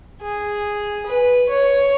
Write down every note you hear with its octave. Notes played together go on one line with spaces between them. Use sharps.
G#4
B4
C#5